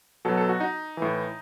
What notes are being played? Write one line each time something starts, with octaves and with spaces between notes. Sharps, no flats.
B2 F#3 A4
A4
F#4
D#4
A2 E3